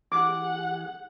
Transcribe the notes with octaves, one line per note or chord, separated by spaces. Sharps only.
E3 G4 G#4 F#5 D6